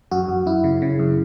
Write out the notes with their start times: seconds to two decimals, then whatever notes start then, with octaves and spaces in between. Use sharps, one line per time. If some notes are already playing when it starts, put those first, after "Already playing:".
0.11 F#2 F#4
0.28 F#2
0.46 F#2 E4
0.64 C#3
0.82 C#3
0.99 F#2